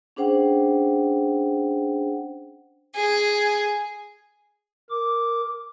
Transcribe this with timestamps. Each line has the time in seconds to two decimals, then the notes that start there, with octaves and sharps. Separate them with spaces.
0.16 C#4 D4 G#4 C5 F#5 G5
2.94 G#4
4.90 A#4 D6